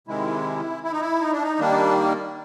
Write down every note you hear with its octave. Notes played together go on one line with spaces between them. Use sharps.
C3 D#3 G#3 E4
E4
D#4
E4
D#4
D4
D#4
D#3 G3 A#3 D4